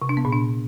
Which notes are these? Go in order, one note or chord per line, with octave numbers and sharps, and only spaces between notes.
C3
D4
B3
A#2
D4